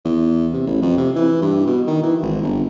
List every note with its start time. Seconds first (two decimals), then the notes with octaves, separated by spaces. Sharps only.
0.05 E2
0.53 C3
0.67 A1
0.82 F2
0.97 C3
1.16 E3
1.42 G2
1.67 B2
1.87 D#3
2.03 E3
2.22 G#1
2.42 G1